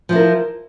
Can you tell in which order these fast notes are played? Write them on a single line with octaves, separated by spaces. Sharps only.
F3 E4 A#4